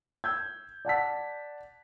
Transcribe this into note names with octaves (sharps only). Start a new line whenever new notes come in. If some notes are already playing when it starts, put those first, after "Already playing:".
E6 G6 G#6
D5 F#5 A5 B6